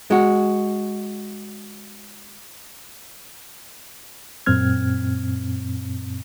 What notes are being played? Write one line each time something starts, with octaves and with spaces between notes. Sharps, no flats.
G#3 F#4
F#2 A#2 C4 F6 G#6